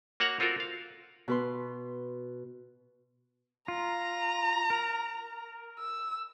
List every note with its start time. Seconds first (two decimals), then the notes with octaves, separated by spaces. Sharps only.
0.20 A#3 F#4 C#5 F#5 A#5
0.40 C4 F4 F#4 A4 A#4
0.60 F5
1.28 B2 B4 C6
3.68 F4 A#5
4.70 A#4
5.79 E6